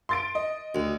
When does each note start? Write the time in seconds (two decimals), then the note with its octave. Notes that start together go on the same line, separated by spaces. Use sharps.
0.09 C6 A6 D7
0.35 D#5
0.75 D2